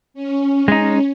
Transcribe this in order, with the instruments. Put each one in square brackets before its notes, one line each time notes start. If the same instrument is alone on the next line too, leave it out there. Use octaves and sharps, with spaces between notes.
[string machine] C#4
[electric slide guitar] G#3 D#4